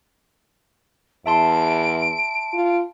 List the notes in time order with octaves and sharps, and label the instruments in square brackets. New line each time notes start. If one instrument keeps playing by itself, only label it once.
[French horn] E2 [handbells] E5 A5 C6 [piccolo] D7
[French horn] F4